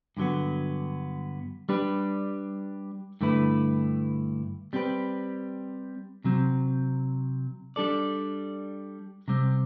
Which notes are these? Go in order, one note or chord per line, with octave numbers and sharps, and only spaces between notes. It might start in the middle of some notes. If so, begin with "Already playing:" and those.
G2 D3 F#3 B3
G3 D4 G4 B4
G2 D3 A3 E4 B4
G3 C4 G4 B4
C3 F#3 C4
G3 D4 A4 D5
C3 G3 C4